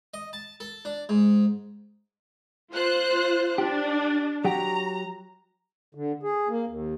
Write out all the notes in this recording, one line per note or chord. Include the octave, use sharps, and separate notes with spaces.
D#5
A5
A4
D4
G#2
F4 C5 F#6
D4 G4
F#3 F#4 G4 A#5
D3
G#4
A#3
D#2